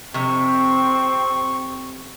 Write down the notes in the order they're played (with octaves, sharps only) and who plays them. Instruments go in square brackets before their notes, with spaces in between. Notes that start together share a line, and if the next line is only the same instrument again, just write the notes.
[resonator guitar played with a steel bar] F2 C3 [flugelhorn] C4 [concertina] C#6